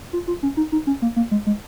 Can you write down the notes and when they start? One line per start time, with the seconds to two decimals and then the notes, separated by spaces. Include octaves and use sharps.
0.13 F4
0.28 F4
0.43 C#4
0.57 D#4
0.72 D#4
0.87 C#4
1.02 A#3
1.16 A#3
1.31 G#3
1.47 G#3